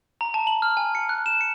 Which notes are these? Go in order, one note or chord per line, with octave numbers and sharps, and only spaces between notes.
A#5
A5
F#7
F6
G#5
C#7
F#6
E7
C#7